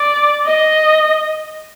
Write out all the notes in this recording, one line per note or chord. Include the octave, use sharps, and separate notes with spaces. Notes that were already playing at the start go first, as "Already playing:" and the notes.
Already playing: D5
D#5